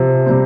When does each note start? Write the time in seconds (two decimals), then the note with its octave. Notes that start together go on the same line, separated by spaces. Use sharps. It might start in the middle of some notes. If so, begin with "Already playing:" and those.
Already playing: C3 F3
0.26 C3 G3 C4